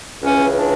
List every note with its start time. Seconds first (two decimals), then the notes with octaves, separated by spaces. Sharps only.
0.22 C#2 C#3 E3 C#4
0.56 D4